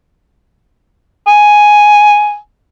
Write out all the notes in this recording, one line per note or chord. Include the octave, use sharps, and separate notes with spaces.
G#5